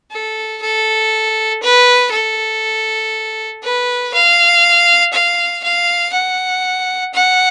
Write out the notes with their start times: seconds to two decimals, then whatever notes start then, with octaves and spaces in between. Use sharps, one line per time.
0.11 A4
0.62 A4
1.62 B4
2.12 A4
3.63 B4
4.13 F5
5.13 F5
5.64 F5
6.13 F#5
7.14 F#5